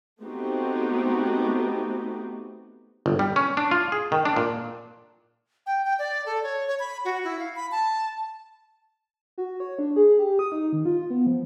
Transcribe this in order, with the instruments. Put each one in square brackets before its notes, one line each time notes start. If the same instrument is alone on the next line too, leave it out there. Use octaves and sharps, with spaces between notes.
[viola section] A3 B3 C4 D#4 F#4 G4
[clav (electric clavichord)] G1
G3
C#4
D4
F4
G#4
D#3
D4
A#2
[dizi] G5
G5
D5
A4
C#5
C#5
B5
F#4
E4
F5
B5
A5
[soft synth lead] F#4
C#5
D4
G#4
G4
D#6
D#4
D#3
F4
B3
F3